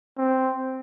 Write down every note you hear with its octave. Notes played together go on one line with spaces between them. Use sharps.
C4